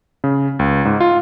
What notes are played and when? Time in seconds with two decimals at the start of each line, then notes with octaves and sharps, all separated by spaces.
0.24 C#3
0.59 C#2
0.85 G#2
1.00 F4